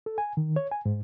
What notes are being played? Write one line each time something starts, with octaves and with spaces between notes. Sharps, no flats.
A4
G#5
D#3
C#5
G#5
G#2